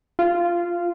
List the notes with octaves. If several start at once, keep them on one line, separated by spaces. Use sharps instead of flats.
F4